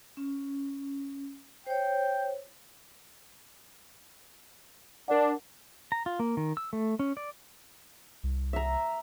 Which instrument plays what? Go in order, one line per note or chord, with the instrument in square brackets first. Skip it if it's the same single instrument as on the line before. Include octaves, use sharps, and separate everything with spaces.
[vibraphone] C#4
[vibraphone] C5 C#5 [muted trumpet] G5
[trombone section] D4 [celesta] A#4 D5 F#5
[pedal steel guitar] A#5
F4
A#3
D#3
E6
A3
C#4
D5
[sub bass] C2
[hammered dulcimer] E5 A#5